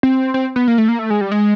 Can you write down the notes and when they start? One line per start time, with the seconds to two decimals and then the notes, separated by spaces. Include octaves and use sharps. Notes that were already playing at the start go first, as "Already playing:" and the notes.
0.03 C4
0.34 C4
0.56 B3
0.68 A#3
0.78 A3
0.89 A#3
0.99 A3
1.10 G#3
1.21 G3
1.32 G#3